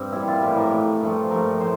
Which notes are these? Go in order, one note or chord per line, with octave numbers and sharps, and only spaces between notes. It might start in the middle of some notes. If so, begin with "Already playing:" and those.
Already playing: G2 C4
A#2 G3 E4
F4
A2 E3 G3
A#4
A#2 A3
G2 F3 A3
G2 F3 A3 A#4
A2 C5